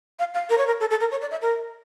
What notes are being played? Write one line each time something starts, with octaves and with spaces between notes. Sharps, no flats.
F5
F5
A#4
C#5
A#4
A4
A4
A#4
C#5
D5
E5
A#4